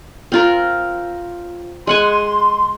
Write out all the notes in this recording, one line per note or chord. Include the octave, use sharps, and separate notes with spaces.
C4 F4 A#4
G#3 F#5 G#5 C6